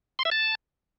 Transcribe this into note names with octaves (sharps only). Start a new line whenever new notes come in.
C6
E5
A5